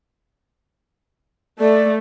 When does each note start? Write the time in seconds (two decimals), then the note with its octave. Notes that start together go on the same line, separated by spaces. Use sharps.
1.60 A3 D5